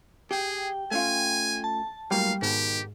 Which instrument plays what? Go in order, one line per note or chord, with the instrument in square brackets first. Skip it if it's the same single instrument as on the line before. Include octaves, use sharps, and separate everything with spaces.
[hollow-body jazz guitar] G4 [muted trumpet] G#4 [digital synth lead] G5
[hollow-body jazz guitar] A3 C#4 F4 [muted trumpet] G#5
[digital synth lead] A5
[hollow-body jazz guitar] A2 F#3 A#3 [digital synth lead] G3 [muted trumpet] F5
[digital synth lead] G#2 [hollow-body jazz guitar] B2 D#3 [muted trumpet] G4